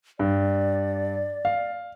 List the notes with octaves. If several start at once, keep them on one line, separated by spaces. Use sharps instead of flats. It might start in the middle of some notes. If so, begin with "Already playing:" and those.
G2 D5
F5